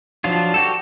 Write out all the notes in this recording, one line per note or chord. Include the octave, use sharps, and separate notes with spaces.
F3 F#3 D4 F4
F#4 G4 A4